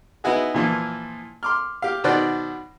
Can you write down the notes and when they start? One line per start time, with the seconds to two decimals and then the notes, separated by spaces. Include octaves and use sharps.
0.24 B3 D#4 E4 F#4 G#4
0.54 A#2 E3 F3
1.43 C6 D6 F6
1.82 G4 F5
2.04 B2 D#3 F#4 C5 D5 F#6